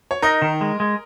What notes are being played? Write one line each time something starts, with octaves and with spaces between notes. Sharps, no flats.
C#5
D#4 A#4 D#5
D#3
G#3
G#3